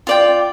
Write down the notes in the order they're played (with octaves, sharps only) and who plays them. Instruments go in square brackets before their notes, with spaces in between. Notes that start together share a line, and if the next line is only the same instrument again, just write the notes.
[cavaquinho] F4 D5 G5